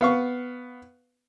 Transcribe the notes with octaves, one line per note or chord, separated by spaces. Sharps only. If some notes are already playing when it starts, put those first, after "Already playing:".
B3 F5 C#6